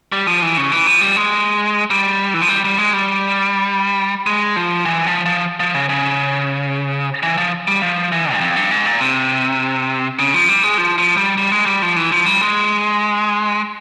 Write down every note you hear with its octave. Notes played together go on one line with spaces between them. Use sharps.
G3
F3
E3
C#3
E3
F3
G3
G#3
G3
E3
F3
G3
G3
G#3
G3
G#3
F3
E3
F3
F3
F3
C#3
C#3
E3
F3
G3
F3
E3
G2
F2
G2
G#2
A#2
C3
C#3
F3
G3
G#3
F3
F3
G3
G3
G#3
G3
F3
E3
F3
G3
G#3